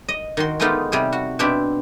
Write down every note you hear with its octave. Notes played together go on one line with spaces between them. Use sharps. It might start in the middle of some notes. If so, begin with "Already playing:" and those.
D#5
D#3 F#4 C6
G#3 A3 B3 D#4 F4 G4
C3 G3 G#4
F#4
B2 C4 D4 E4 G4